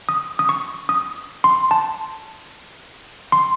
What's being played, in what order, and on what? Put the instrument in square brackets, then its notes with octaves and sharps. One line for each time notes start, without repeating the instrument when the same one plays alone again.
[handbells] D#6
D#6
C#6
D#6
C6
A5
C6